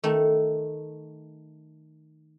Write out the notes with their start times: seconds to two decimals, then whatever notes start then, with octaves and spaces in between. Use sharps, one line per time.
0.04 D#3 A3